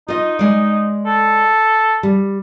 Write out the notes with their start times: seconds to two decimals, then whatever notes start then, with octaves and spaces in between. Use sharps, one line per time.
0.08 D#4 F4 D#5
0.39 G#3 D5
1.06 A4
2.03 G3